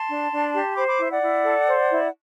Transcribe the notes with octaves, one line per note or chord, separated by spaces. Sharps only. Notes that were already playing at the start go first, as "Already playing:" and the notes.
Already playing: A5 C6
D4
D4
G4
C5 B5 D6
B5 D6
E4 E5
D5 F#5
E4
A4
C5
E4